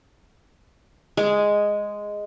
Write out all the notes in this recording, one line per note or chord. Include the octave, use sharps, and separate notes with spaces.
G#3